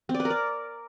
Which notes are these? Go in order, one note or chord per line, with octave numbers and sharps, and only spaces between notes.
C4
D5
B4
A#4
D5